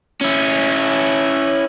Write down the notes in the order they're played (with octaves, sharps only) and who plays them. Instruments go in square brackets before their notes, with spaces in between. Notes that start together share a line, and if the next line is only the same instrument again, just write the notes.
[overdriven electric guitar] C#4 E4